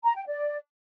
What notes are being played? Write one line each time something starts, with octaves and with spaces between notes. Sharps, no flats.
A#5
G5
D5